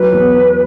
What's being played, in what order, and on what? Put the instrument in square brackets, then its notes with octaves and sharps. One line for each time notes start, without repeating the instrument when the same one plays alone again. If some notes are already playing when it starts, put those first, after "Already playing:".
Already playing: [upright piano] F#3 [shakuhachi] B4
[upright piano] E2
B3